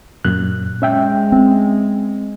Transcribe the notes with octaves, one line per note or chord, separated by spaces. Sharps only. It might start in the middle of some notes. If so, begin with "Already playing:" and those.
F#2 A#2 F#6
G#3 C#4 E5 G5
C4